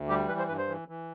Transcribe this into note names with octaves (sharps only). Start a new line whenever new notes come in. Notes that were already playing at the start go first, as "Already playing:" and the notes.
Already playing: D2
G3 G4
E3 B4
C5
G2 B4
C5
E3
E3